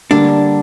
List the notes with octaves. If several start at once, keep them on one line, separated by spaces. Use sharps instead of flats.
D3 G3 A#3 D4